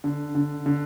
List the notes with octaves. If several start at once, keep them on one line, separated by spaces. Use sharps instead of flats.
D3
D3
D3